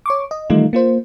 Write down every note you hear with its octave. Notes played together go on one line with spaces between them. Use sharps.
C#5 C#6 D6
D#5
D#3 E3 G3 A3 D#4 F4
A#3 F4 C5